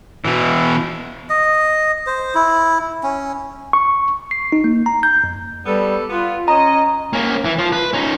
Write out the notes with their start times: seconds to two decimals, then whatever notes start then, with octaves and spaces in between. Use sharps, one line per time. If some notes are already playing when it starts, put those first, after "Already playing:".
0.25 B2 E3
1.29 D#5
2.07 C5
2.35 E4
3.03 C#4
3.73 C#6
4.31 C7
4.52 D#4
4.64 A#3
4.86 A#5
5.03 G6
5.24 F2
5.66 G3 B3 A4
6.10 B3 F4
6.48 C#4 D#5 A#5
7.13 A#3 C#4
7.45 E3
7.58 F3 F4
7.72 B4
7.93 C#4 D#4